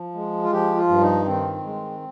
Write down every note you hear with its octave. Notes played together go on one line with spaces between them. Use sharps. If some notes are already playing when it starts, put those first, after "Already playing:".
Already playing: F3
G#3
F4
F3 G4
F4
G2
D#4
D#3 C4
G#3